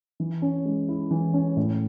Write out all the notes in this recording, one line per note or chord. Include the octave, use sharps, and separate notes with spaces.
E3
C#4
G#3
E4
E3
C#4
A2